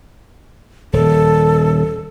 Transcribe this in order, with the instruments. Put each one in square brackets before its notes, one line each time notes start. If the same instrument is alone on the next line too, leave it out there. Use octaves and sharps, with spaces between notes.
[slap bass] D#1 [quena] A4